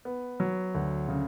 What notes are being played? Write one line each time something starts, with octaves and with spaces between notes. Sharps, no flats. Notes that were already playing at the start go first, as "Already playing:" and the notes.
B3
F#3
D2
C#3